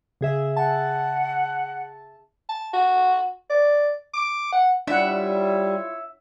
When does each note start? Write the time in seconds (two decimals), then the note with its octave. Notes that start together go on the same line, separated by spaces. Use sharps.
0.21 C#3 G#4 E5
0.57 F#5 A5
2.49 A5
2.74 F#4
3.50 D5
4.14 D6
4.53 F#5
4.87 G3 D4 E4 F4 C#5 E5 F#5